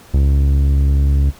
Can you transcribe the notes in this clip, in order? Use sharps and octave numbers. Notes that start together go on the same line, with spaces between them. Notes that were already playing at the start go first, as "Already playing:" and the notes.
C#2